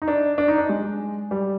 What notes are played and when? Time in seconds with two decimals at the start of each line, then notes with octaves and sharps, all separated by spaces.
0.02 D#4
0.08 D4
0.38 D4
0.48 D#4
0.58 D4
0.69 G#3
1.31 G3